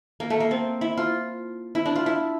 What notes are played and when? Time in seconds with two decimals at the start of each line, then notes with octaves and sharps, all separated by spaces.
0.20 A#3
0.30 A3
0.40 A#3
0.51 C4
0.81 E4
0.97 F4
1.75 E4
1.86 D4
1.96 F4
2.06 E4